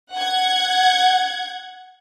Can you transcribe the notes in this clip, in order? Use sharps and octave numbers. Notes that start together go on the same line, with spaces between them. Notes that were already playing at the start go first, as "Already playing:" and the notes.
F#5 G#6